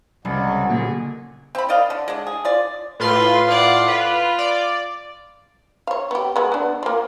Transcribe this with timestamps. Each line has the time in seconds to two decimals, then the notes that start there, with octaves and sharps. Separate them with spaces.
0.25 C2 C#3 F#3 G#3 F#4
0.69 A#2 D3 F#3 A#3 D4 G#4
1.55 C4 B5
1.69 A#4 D5 D#5 F5
1.90 D3
2.08 G#3 D4
2.27 G#4
2.45 F4 D5
3.00 A2 F4 B4 C6
3.49 D5 F#5
3.88 F4 B4
4.39 D5
5.87 C#5 F5
6.11 B3 G4
6.36 G#3 B3
6.52 B3 D4
6.83 F3 A#3